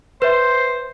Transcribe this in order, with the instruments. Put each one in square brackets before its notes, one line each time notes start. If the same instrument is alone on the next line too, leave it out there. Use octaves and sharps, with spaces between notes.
[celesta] B4 E5 [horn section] C5